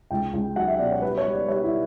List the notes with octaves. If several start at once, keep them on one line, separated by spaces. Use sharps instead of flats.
C#2 G5
C#2
F#3 F#5
E5
B2 D5
C#5
G3 B4
C#5
G3
D5
G3 C#5
E4